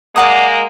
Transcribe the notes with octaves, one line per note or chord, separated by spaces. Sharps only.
G#3 A#3 D5 F#5 A#5 D#6